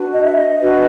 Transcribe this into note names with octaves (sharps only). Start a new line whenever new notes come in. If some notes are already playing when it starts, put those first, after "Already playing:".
Already playing: D4 F#4 B4
D#5
E5
D#5
D4 F#4 B4